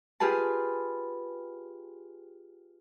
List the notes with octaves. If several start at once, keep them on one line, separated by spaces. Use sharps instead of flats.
F4 G4 G#4 B4 A5